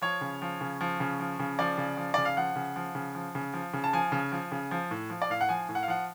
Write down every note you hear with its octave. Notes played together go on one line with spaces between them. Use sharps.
F3 C#5
C#3
F3
C#3
F3
C#3
F3
C#3
F3 D5
C#3
F3
C#3 D5
F5
F3 F#5
C#3
F3
C#3
F3
C#3
F3
C#3
A5
F3 G#5
C#3
F3
C#3
F3
A2
F3
D5
A2 F5
F#5
F3 G#5
A2
F#5
F5
F3 F#5